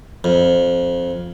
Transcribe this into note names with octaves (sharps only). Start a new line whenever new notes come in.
F2